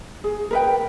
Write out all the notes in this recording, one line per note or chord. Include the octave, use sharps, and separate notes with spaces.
G#4
A#4 B4 G5